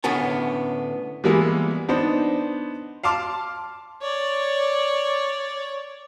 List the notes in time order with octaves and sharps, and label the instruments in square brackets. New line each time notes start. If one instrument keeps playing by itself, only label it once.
[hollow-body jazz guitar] A2 D3 B3 C#4 C#5 A5
[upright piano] E3 G3 G#3 A#3 B3 E4
B3 D4 D#4 C5
F5 A5 C6 D6 F6
[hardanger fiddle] C#5 D5